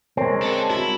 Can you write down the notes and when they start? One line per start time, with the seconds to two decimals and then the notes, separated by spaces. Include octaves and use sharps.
0.17 G#3 C4 A#4 C#5
0.42 D4 A4
0.70 E4 F#4